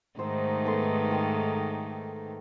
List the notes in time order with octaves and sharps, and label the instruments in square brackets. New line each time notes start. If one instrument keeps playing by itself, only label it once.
[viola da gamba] G#2 D#3 A3 [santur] C5 A#5 E6
[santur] B3 A4 C6
A4 G5 C6